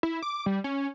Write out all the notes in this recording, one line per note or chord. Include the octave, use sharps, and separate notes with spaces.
E4
D6
G3
C#4